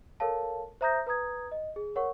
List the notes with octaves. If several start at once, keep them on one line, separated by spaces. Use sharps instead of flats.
A4 A#4 C#5 F5 A5
C5 E5 A#5 D#6 G6 A#6
B4 A#5 D#6 G#6
D#5
G#4
A#4 C#5 F#5 C#6